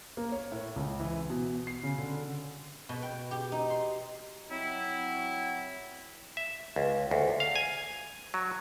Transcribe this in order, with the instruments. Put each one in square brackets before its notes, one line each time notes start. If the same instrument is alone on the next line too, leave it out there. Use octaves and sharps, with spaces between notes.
[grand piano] A#3
C#5
A2
C#2
E3
B2
C7
C#3
D3
[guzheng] B2
G5
G4
D#4
C6
[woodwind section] F#3 C4 E4
[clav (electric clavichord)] E5
C#2
D2
F5
G#5
F#3